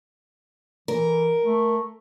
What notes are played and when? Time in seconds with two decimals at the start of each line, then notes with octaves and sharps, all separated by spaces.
0.88 E3 A#4
1.45 A3